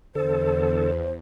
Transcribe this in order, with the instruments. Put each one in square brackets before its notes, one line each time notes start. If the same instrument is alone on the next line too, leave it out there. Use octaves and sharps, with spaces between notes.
[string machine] E2 [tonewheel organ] D3 A4 [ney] C5